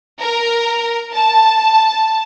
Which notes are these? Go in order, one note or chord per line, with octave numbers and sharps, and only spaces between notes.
A#4
A5